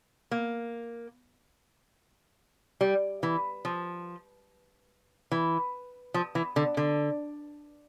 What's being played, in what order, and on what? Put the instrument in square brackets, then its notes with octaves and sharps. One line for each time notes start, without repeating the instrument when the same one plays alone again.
[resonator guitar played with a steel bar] A#3
G3
E3
F3
E3
F3
E3
D3
D3